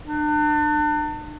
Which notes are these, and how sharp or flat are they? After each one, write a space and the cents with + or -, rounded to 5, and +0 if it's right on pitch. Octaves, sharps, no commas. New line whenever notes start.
D4 +35